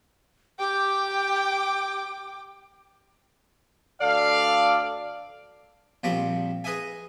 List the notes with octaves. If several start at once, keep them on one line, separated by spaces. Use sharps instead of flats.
G4 G5 D6
D2 A4 D5 F5
A#1 F3 G3 C4 B5 C#6
G#4 B4 D#5 E5 G#5